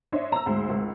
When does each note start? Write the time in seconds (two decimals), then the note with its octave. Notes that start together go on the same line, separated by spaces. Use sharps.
0.12 D4 C5 C#5 D#5 E5
0.32 A#5 E6
0.46 D2 G#2 C5
0.69 G#1 C#2